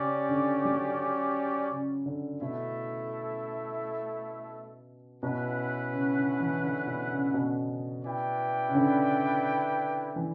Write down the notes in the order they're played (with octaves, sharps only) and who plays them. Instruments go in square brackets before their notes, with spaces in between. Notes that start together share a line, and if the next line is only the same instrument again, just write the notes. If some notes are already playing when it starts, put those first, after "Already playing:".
Already playing: [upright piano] C#3 [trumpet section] C#4 G4 D5
[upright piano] D3
F#3
C#3
D3
[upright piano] B2 [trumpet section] A3 E4 A4 E5
[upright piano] B2 [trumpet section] C#4 E4 B4 F#5
[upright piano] C#3
D3
E3
D3
B2
C#3
B2
[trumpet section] E4 B4 D5 G5
[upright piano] C#3
D3
E3